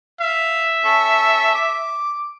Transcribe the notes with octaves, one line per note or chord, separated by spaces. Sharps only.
E5 F5
C#4 A4
D6